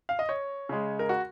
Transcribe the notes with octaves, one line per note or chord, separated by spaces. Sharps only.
F5
D#5
C#5
C#3 G#3
A#4
F#4